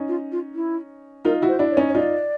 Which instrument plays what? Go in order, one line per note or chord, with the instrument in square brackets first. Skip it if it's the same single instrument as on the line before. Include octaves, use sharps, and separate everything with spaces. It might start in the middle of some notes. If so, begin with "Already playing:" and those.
Already playing: [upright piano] C#4 D#4
[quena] F4
F4
E4
[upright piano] D#4 F4 [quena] A#4
[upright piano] E4 F#4
[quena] C5
[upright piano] D4 E4
[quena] C#5
[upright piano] C#4 D#4
[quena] C#5
[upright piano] D#4 F4 [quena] D5